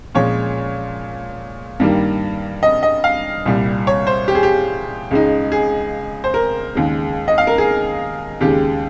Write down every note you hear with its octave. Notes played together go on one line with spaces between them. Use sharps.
A#2 F3 G#3 C#4 C#5
G2 D#3 G3 A#3
D#5
D#5
F5
C2 A#2 G3
C#5
C5
G4
G#4
G4
C#2 C#3 G#3 D#4
G#4
C5
A#4
D#2 C#3 G#3
D#5
F5
A#4
G#4
D#2 C#3 G#3 G4